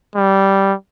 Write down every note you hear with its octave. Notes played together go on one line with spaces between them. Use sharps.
G3